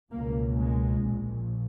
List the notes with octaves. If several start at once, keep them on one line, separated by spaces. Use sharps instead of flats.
C#2 B2 A#3
G#3
A#1 A#2